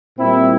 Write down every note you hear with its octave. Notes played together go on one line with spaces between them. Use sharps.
A#2 G3 C4 E4